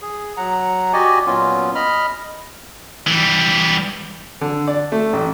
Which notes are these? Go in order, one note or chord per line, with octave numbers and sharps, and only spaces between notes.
G#4
F#3 F#5 A#5
F#4 G4 D5 D#5 G#5
A#2 F#3 B3 C#4 F4
D#5 B5 F6
E3 G3
D3
D5
A3
A1